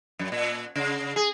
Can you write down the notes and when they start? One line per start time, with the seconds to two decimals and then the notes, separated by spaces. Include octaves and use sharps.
0.19 F#2
0.32 A#2
0.76 C#3
1.16 G#4